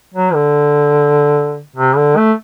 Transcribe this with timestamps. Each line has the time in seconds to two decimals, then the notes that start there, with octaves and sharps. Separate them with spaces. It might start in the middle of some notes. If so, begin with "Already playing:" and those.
0.14 F#3
0.34 D3
1.76 C3
1.96 D3
2.17 A3